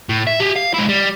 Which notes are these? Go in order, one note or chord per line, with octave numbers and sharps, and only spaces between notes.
A2
E5
G4 G#4
F5
G#3 E4
G3